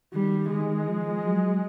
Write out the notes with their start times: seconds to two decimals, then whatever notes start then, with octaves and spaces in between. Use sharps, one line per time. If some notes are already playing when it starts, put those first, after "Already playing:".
0.14 D#3 G3
0.51 D#3 G#3
0.88 F3
1.25 F#3